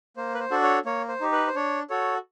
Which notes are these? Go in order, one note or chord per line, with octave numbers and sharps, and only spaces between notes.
A#3 C5
B4
C5
D4 F#4 A4
C#5
A#3 C#5
C5
D#4 G4
B4
C5
D4 C#5
F#4 A4 C#5